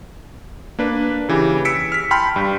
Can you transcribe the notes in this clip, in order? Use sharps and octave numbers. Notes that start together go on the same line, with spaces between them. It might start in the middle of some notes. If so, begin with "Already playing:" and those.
A#3 D4 B4
C#3 E3 G4
E6 B6 C#7 D7
F6 B6
G5 A5 B5 C6 F6
G2